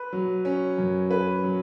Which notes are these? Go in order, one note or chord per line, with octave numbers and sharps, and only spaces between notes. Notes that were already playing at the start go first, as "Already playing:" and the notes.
Already playing: B4
F#3
C#4
F#2
B4
F#3